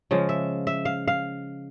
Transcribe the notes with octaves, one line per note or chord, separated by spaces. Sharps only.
C#3 F3 G#3
E5
E5
F5
F5